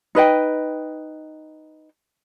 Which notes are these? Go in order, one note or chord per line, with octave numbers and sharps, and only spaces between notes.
D#4 B4 D#5 G5